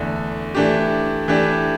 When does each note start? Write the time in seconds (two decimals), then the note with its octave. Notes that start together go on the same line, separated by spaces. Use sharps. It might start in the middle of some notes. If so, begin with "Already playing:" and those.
Already playing: E2 D3 A3
0.55 E3 A3 D4 G4
1.28 E3 A3 D4 G4